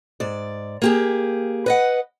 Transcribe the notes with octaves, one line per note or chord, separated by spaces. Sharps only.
G#2 D5
A#3 G4 G#4
B4 D#5 F#5